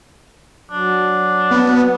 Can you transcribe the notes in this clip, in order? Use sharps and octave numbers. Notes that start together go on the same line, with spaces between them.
F#3 D4
B3